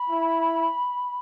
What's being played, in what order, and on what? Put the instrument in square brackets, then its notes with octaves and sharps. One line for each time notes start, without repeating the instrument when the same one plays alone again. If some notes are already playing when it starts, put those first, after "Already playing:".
Already playing: [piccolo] B5
[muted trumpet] E4